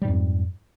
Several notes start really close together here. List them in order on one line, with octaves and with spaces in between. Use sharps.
G3 G#2 F2